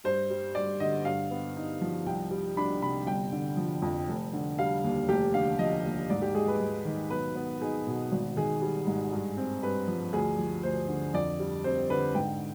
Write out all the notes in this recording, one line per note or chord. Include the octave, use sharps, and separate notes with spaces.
G2 C5
G3
G2 D5
D3 D#5
G2 F5
B3
D#4
F3
C2 G5
G3
D4 B5
C3 B5
G1 G5
D3
F3
F2
F1
D3
G3 F5
D#2
F1 G4
D3 F5
F3 D#5
D#2
G#2 D5
G4
G#3 G#4
B4
G#2
D#3
B1 B4
B3
D#4 G#4
B2
G#1
D#3 G#4
G3
G#2
G2
C4
G2 B4
F3
D2 G#4
F3
D2 C5
D3
F2 D5
G3
C4 C5
D3 B4
G#2 G5